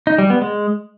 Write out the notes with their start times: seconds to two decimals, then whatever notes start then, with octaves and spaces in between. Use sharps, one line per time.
0.07 D#4
0.18 G3
0.30 B3
0.41 G#3